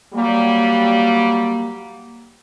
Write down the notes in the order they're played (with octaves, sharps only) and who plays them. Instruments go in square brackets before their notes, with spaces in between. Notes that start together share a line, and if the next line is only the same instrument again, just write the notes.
[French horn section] F#3 G3 [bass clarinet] A#3